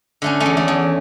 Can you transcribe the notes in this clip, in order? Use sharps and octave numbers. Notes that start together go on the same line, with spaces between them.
D3 A3 C#4
A3 C#4
E2
A3
E2